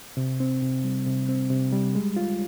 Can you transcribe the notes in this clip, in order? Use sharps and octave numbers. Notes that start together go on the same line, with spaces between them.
C3
C4
C3
G3
C3
C4
C3
G3
G#3
F4